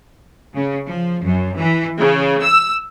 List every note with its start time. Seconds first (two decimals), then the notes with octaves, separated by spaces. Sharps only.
0.54 C#3
0.88 F3
1.23 F#2
1.56 E3
1.99 C#3
2.43 E6